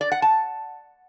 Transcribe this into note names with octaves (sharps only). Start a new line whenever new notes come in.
D5
F#5
A5